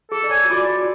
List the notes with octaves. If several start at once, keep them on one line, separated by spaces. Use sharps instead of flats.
G#4 A4
D5
C#5 G#5
F#4
F4 D5
F#4